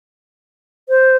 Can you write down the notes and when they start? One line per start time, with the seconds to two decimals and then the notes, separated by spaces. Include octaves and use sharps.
0.89 C5